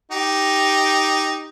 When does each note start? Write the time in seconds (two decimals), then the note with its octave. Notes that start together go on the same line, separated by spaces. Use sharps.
0.11 D#4 G4